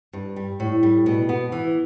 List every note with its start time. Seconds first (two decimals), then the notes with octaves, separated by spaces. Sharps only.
0.13 G2
0.36 G3
0.60 A2
0.83 G3
1.06 B2
1.29 B3
1.52 E3